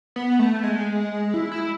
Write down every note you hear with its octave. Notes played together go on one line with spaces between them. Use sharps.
B3
A3
G#3
E4
E4